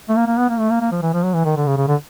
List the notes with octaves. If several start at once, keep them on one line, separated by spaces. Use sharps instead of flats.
A3
A#3
A#3
B3
A#3
A3
A#3
A#3
F3
E3
F3
F#3
E3
D#3
D3
C#3
C#3
D3